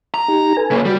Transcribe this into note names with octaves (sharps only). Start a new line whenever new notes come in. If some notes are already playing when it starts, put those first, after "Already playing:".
A#5
D#4 G4
A4 B4 G#5
C#3 A#3
G3 F#4